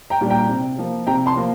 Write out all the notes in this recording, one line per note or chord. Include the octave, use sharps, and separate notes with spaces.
G5 A#5
A#2 G3 D4
G5 A#5
C3
F3 A#3
C3 G5 A#5
A5 C6
F3 A#3